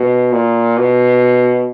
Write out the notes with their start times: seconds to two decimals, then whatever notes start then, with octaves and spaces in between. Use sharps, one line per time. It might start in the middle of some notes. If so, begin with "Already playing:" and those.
Already playing: B2
0.33 A#2
0.77 B2